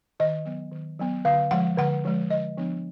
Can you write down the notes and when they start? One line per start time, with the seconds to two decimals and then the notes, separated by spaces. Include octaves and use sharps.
0.20 D#3 D#5
0.45 F#3 B3
0.72 D#3
0.99 F#3 B3
1.25 D3 F5
1.51 F3 G#3 F#5
1.78 D3 F#5
2.05 F3 G#3
2.30 D3 D#5
2.58 F3 B3 D4